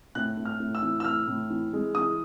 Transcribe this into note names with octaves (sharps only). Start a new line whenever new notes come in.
A2 F#6
A2
F6
A2
E6
E3
E6
A2 F6
A2
E3
G#3
E3 D#6